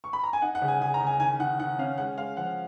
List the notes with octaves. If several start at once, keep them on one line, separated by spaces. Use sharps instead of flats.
C#6
B5
A#5
G#5
D#4 F#5
F#5
C#3
G#5
C#3 G#5
A#5
C#3
G#5
D#3 G#5
D#3 F#5
D#3 F#5
C#4 F5
G#3 F#5
G#3 F5
F3 F#5